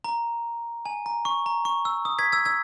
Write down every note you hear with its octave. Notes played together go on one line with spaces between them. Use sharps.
A#5
G#5
A#5
C#6
A#5
C#6
E6
D#6
G#6 B6
E6 G#6
E6 G#6